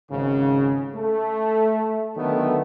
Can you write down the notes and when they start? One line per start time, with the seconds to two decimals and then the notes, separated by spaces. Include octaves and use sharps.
0.10 G#1 C#3
0.95 A3
2.17 D3 D#3 F#3 A3 B3